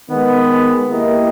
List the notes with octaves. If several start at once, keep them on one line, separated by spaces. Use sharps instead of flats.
D#3 G#3 B3
A#3 E4 G4 A#4 D#5